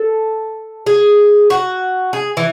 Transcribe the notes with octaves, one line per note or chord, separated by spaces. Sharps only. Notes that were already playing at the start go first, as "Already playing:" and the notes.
Already playing: A4
G#4
F#4
G#4
E3